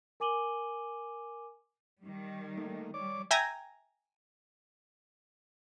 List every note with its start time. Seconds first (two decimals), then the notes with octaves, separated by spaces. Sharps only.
0.20 A#4 G#5 D6 D#7 F#7 G7
2.01 D#3 G3
2.57 A3 A#3 D#4
2.94 G3 C#5 D5 D6
3.31 E5 G5 G#5 A#5